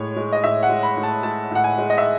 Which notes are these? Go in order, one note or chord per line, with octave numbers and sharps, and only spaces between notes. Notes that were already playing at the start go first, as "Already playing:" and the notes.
Already playing: A2 G#3 C#5
G#3
D#5
A2 E5
F#5
G#3
B5
A2
A5
G#3 A5
A2 F#5
G#5
G#3
D#5
E5